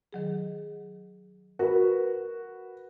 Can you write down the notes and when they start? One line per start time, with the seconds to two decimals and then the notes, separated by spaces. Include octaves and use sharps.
0.13 D#3 F#3 G#4
1.59 F#4 A#4 B4